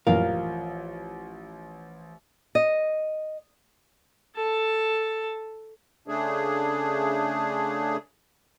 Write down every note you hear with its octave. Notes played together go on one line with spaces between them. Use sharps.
A1 F#2 A#2 E3 F3 A#4 F5
D#5
A4 A5
C#3 A3 D4 G#4